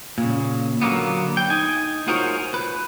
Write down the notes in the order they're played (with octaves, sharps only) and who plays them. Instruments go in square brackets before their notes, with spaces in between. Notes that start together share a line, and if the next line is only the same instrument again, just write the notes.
[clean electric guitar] A#2 C#3
D3 F#3 A#3 B3
G5
D#4 G#5
F4 F#4 G#4 A#4 C5 C#5
B4